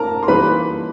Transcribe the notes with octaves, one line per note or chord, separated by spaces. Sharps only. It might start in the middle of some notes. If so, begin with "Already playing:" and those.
Already playing: A#4 A5 A#5
C6
E3 G3 A#3 D#4 B4 B5